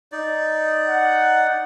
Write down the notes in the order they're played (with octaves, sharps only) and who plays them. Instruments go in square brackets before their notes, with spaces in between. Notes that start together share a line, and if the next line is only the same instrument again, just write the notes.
[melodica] D#4 D5
[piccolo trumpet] F#5